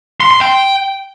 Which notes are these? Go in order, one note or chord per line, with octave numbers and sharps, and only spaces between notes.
C6
C6
G5